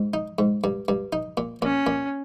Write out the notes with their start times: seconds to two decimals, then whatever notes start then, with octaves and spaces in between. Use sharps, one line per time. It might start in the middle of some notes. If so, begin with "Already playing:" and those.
Already playing: G#2
0.14 D#4
0.39 G#2
0.64 G2
0.88 G2
1.13 D#4
1.37 A#2
1.62 A#2 C#4
1.87 A#2